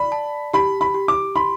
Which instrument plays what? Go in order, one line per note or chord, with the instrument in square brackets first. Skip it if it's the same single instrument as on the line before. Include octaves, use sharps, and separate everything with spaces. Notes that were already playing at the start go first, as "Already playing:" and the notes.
Already playing: [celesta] D5 [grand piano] B5
[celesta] A5
[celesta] G4 [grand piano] B5
[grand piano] B5
[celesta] G4
[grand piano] D6
[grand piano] B5 [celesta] C6